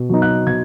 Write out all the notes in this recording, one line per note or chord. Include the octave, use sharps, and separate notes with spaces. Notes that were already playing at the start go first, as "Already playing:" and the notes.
Already playing: B2
F#3 B3 D#4
F#6
B2 G#6